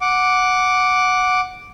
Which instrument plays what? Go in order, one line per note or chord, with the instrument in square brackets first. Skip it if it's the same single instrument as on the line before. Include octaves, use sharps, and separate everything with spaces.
[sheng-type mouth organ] F#5 D6